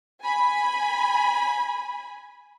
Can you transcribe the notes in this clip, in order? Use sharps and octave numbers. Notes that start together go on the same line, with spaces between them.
G#5 B5